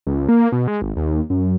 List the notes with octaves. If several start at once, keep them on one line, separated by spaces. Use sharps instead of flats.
C#2
A#3
B2
G#3
G#1
D#2
F#2